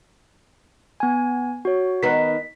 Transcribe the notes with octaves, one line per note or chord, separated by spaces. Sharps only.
B3 G#5
F#4 C#5
D#3 B3 D#4 B6